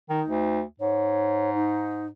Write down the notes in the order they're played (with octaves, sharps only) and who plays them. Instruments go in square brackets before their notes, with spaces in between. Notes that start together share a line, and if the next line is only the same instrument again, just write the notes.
[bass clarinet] D#3 [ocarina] D#4
[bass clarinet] D2
[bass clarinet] G#2 [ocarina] C#5
[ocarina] D#4